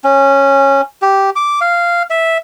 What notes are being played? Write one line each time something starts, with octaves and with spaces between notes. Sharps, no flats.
C#4
G4
D6
F5
E5